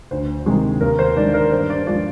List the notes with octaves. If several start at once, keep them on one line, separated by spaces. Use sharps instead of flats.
D2 C5
C3 D#3 G#3
D#2 A#4
C5
D#3 G#3 D4 D5
A#4
G2 C5
D4 D5
F3 G#3 D4 D5